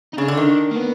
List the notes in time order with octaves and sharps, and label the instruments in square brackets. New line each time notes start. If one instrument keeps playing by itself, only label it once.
[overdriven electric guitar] D#4
[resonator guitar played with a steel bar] C#3 [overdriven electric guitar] D4
[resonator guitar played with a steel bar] D3
D#3
[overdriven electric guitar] A#3
B3